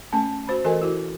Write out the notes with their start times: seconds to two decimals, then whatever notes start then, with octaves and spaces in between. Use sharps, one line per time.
0.12 A3 C#4 G#5 A5
0.47 F#4 C5 B5
0.64 E3 F#4 A4 A#4 D#5 G#5
0.82 E4 F#4